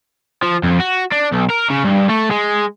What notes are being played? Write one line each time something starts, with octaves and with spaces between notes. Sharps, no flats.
F3
F2
F#4
D4
B1
A#4
C#3
G2
A3
G#3